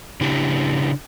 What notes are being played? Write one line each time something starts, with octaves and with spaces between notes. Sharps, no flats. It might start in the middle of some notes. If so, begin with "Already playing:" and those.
C#3 D4 E4 G4